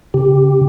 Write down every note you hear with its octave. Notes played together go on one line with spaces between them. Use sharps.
C#3 G4